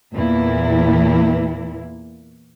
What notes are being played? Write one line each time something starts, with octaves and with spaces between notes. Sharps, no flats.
E2 A#2 E3 A#3 E4